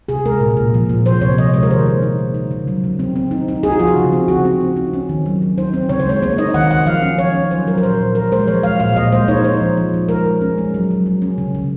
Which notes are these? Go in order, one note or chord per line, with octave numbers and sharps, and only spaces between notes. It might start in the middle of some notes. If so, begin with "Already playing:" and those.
C3 G#4
G#3 A#4
A#2
A#2
F3
A#2
F3 C5
C3 C#5
F3 D#5
G#3 C#5
A#4
D#3 C5
A#3
D#4
A#3
D#4
C#3
F#3
C#3
C4
C4
D#4
D#4
D#4 G#4
F#4
F3 F4
F#4
C#3
C4
C#3 F#4
C4
C4
D#4
C#4
D#3
F#3
F#3
D#4 C5
C4
C#3 C#5
C5
G#3 C#5
A#3 C#5
D#4 D#5
D#3 F#5
D#3 F#5
F3 F5
C#4
F3 C#5
C#4
F#3 C5
F#3 A#4
A#4
A#2 C5
A#2
F3 A#4
G#3 C5
F3 C#5
G#3 F5
A#2 F5
A#2 D#5
G#3 C5
D#4 C#5
D#4 C5
F3
F3
F3
G#3 A#4
G#3
C#4
G#3
F#3
F#3
F#3
C#4
C#3
C#3